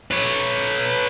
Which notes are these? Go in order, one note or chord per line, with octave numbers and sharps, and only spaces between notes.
B4 C#5